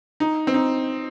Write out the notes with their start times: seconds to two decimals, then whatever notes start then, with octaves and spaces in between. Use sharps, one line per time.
0.20 D#4
0.47 C4
0.54 D#4